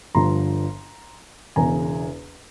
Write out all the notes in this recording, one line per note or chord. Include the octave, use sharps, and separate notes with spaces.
G1 G2 D3 F3 A#5 C6
E1 E2 C#3 G#5 A#5